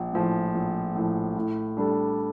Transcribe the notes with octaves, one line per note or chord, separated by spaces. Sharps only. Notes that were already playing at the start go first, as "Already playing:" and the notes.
Already playing: A#1
A2 F3
A#1
A2 F3
A2
G3 D4 A4